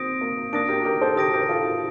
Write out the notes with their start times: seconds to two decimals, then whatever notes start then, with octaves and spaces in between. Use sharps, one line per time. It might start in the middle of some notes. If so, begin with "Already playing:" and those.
Already playing: A#3 C4 D#6 A#6 D7
0.21 A#3
0.53 A#3 D4 D#6 A#6 D7
0.68 G4 A#4
0.84 G4 A#4
1.02 A4 C5
1.17 G4 A#4 D#6 A#6 D7
1.33 G4 A#4
1.49 F4 A4